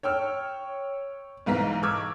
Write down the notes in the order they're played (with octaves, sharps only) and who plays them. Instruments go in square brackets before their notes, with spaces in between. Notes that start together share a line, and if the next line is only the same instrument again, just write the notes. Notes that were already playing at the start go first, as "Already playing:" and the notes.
[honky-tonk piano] C#5 G5 E6 F6
B1 G#2 E3 F5 A#5 B6
C#6 D6 E6 F6 G#6